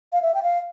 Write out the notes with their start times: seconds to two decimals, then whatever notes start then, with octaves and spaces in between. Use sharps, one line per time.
0.13 F5
0.22 E5
0.34 G5
0.43 F5